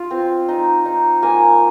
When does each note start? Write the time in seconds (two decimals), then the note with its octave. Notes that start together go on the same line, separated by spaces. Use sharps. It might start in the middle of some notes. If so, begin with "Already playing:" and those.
Already playing: F4
0.11 C4
0.48 D#4
0.85 D#4
1.22 A#3 G#5